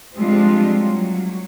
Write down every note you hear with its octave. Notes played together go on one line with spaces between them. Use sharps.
F3 G3 G#3 C4 D4 F4
F#3